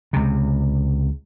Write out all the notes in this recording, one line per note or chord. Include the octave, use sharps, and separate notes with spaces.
C#2 C3